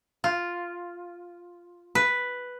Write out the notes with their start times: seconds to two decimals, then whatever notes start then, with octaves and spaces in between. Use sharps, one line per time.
0.24 F4
1.95 B4